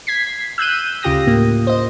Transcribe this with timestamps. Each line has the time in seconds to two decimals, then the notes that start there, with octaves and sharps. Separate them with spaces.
0.07 G#6 B6 C7
0.58 E6 F#6 G6 D#7
1.03 D2 C#3 F4 G4 D#6 A#6
1.27 A2 A#3
1.67 C5 D#5